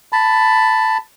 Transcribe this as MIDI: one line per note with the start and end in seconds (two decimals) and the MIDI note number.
0.13 0.98 81
0.13 0.98 83